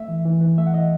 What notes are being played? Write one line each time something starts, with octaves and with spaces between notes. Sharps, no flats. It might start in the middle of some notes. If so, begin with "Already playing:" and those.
Already playing: A3 E5
E3
E3
E3
A3 E5
F#5
E3 D#5